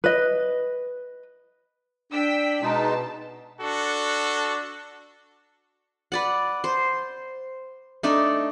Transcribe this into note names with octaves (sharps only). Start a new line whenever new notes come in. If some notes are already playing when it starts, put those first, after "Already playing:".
B4 D#5
D4 G5 E6 B6
B2 G#3 D#4 A5
D4 F#4 A4
B4 D5 F#5
C5
A3 D4 D#4 D5